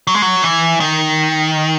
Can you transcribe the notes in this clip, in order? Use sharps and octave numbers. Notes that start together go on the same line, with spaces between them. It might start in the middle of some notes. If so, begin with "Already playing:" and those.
F#3
G#3
F#3
E3
D#3